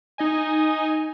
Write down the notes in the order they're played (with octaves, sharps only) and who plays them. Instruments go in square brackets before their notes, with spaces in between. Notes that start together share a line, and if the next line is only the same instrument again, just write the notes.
[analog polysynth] D#4 D#5 G#5